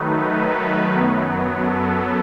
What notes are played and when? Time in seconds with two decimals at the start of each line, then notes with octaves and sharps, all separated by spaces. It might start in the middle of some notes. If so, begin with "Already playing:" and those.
Already playing: D#3 F#3 A3 D#4 B4
0.25 B4
0.94 F#2 F#3 B3
1.64 A4